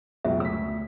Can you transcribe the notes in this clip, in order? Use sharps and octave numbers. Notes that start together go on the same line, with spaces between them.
F#1 C#2 B2 E5
D2 E6 B6